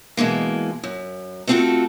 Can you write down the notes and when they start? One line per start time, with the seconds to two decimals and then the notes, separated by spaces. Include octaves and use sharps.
0.17 B2 E3 G#3 A#3
0.84 F#2
1.47 A3 B3 C4 F4 F#4 A4